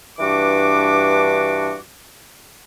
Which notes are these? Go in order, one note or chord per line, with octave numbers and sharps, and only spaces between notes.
G2 E3 D4 F#4 D6